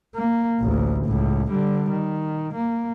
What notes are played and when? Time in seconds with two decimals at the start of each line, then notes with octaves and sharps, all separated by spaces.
0.15 A#3
0.60 A1 D2
1.06 C#2 A2
1.50 D3 G3
1.91 D#3
2.54 A#3